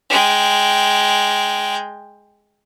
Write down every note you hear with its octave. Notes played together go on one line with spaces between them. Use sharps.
G#3 G5